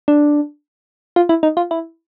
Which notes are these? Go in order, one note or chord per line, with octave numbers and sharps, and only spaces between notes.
D4
F4
E4
D#4
F4
E4